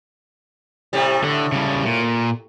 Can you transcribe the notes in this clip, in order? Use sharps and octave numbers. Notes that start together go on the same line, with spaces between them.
A2 C3 G3
A2 D3
C#3 G3
A#2